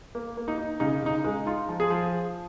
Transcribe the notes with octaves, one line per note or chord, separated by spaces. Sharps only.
A#3
A#3
D#4
D#4
C#3 D#4
C#3 D#4
G#3
D#4 F4
F3
G#4
F3